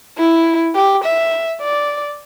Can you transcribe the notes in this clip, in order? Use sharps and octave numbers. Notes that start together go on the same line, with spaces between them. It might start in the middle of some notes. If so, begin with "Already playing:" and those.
E4
G4
E5
D5